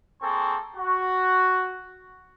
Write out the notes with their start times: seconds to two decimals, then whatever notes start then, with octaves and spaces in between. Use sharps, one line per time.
0.21 A#3 C4 G#4 A4 C#6
0.77 F#4